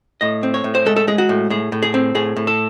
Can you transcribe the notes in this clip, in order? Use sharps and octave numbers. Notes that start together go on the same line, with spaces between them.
A2 D#5
C4
C#5
A2
C5
G#3 A4
A4
G#3 G#4
F#4
A2
A2 G#4
A2
G#4
C4
A2 G#4
A2
A4